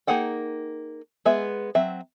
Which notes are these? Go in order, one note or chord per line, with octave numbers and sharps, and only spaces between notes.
A#3 D#4 G#4 F#5 G5
G#3 B3 G#4 E5
F#3 C4 E5